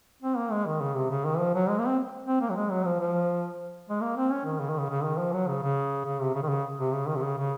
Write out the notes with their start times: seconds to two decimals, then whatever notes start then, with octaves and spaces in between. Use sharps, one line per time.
0.22 C4
0.37 A#3
0.51 G#3
0.66 D#3
0.81 C#3
0.95 C3
1.11 C#3
1.25 D#3
1.39 F3
1.54 F#3
1.69 G#3
1.78 A#3
1.87 C4
2.26 C4
2.41 A#3
2.50 F#3
2.56 G#3
2.71 F#3
2.85 F3
3.00 F3
3.89 G#3
4.01 A#3
4.17 C4
4.31 C#4
4.45 D#3
4.60 C#3
4.69 D#3
4.79 C#3
4.89 C#3
5.03 D#3
5.18 F3
5.33 F#3
5.47 C#3
5.62 C#3
6.05 C#3
6.21 C3
6.34 C#3
6.43 D#3
6.49 C#3
6.79 C3
6.93 C#3
7.07 D#3
7.16 C3
7.22 C#3
7.37 C#3